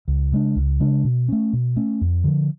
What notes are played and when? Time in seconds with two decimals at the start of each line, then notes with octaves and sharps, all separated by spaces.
0.08 C#2
0.32 C#3 G#3 D4
0.56 C#2
0.80 C#3 G#3 D4
1.04 B2
1.29 A3 C#4
1.53 B2
1.76 A3 C#4
2.01 F2
2.24 D3 F3